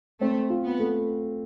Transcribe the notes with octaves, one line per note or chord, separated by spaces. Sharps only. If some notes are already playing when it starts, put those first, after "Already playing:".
A3 C4
F4
B3
A3